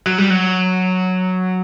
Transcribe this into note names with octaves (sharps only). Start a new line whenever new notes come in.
F#3
G3
F#3